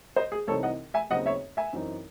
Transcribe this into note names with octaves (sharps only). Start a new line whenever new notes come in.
C5 D#5
G#4
C2 C3 E3 C4 D#4 A4 C#5
D#5 F#5
E5 G#5
D#2 C#3 F#3 C4 D#4 D#5 F#5
C#5 E5
E5 G#5
F#2 E3 C4 D#4